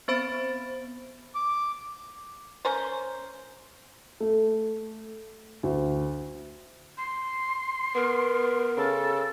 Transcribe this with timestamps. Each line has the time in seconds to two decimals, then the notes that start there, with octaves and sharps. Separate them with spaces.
0.08 B3 C4 C5 B5 A6 D7
1.35 D6
2.65 C#4 A#4 C5
4.20 A3
5.63 D2
6.98 C6
7.95 B3 A#4
8.77 C#3 A4